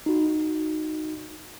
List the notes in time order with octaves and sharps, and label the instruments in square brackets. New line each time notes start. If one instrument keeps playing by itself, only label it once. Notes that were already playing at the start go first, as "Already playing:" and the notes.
[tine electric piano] D#4 F#4